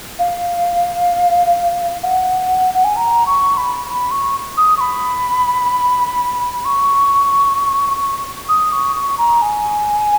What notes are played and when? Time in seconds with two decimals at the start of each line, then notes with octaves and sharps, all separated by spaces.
0.19 F5
2.03 F#5
2.74 F#5
2.84 G#5
2.97 A#5
3.26 C#6
3.57 B5
3.89 B5
4.11 C#6
4.57 D#6
4.77 C#6
4.81 B5
6.65 C#6
8.49 D#6
8.73 C#6
8.96 C#6
9.18 A#5
9.42 G#5